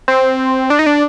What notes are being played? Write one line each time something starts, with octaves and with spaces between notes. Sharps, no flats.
C4
D4
D#4
D4